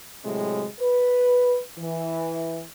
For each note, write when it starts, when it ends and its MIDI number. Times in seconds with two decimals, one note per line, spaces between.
0.24 0.66 45
0.24 0.66 48
0.24 0.66 54
0.24 0.66 56
0.80 1.58 71
1.78 2.64 52